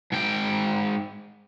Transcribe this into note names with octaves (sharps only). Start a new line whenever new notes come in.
G#2 G5